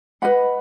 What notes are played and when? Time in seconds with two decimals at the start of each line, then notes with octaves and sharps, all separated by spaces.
0.22 B4 D#5 F#5 B5